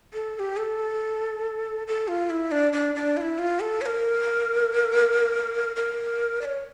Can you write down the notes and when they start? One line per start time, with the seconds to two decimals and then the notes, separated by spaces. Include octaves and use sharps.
0.14 A4
0.35 A4
0.39 G4
0.57 A4
1.87 A4
2.08 F4
2.30 E4
2.51 D4
2.73 D4
2.95 D4
3.17 F4
3.21 E4
3.38 F4
3.60 A4
3.81 C#5
3.86 A#4
5.76 A#4
6.41 D5
6.45 C#5